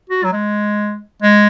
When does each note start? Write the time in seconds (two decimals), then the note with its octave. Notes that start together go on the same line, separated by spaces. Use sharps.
0.10 F#4
0.24 F#3
0.33 G#3
1.22 G#3